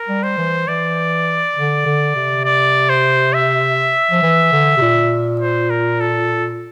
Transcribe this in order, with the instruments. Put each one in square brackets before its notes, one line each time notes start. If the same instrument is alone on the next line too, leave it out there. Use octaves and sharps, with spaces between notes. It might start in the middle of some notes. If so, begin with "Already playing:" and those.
Already playing: [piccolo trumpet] A#4
[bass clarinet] G3
[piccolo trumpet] C5
[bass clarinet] E3
[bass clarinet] E3 [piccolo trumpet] D5
[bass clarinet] D3
D3
C3
[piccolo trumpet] D5
C5
E5
[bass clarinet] F3
E3
D3
C3
A#2
[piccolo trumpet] C5
A#4
A4